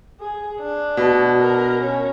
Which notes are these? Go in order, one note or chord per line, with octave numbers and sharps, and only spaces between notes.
G#4
D4
B2
A#4
C#4